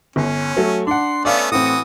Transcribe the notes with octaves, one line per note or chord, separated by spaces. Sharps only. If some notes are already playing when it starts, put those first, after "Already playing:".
G1 C#4
F#3 A3
D4 F#5 C6
A3 B3 C#4 D5 F5
A2 E3 C4 F#4 D#6